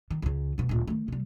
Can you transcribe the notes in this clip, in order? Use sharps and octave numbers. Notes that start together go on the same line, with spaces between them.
D#3
C#2 C#3
F1 B2
D1 A#2
D#3 A3
C3 G3